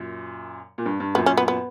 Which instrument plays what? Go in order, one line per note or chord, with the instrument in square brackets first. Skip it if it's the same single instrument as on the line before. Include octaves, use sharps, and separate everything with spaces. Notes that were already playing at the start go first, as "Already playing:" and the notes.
Already playing: [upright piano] F#2 A#2
A#2
G2
G2
[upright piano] F#2 A#2 [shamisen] B3
[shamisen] C#4
B3
B3